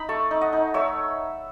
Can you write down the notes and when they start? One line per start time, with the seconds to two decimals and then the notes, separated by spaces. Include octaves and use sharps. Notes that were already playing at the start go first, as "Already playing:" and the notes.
Already playing: D#4 B5
0.09 A3 A5 C#6
0.31 D#4
0.41 D#5 F#5
0.52 D#4
0.74 A3 C#5 E5